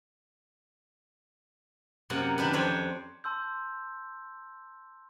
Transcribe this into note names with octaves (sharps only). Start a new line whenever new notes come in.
F#2 C3 A#3 F#5
D#3 D4 G4 B4
F2 C4 D4 C5 C#5
A5 C6 E6 G6